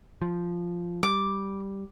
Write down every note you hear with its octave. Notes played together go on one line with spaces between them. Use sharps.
F3
G3 D6